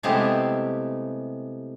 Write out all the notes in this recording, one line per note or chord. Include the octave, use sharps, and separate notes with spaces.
C3 G#3 A3 B3 E4 G4